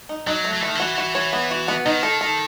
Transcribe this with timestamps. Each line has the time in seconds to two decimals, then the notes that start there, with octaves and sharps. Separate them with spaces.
0.09 D#4
0.27 F#3 D#4
0.44 A3
0.53 F#3
0.61 E3 A3
0.68 D#3
0.75 E3 F#4
0.98 F#4
1.15 C#5
1.33 B3
1.51 F#4
1.68 B3
1.85 D#3 D#4
2.03 A4
2.21 A4